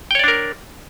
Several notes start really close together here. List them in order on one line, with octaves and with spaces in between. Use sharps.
G5 C#5 D5 D4 A#4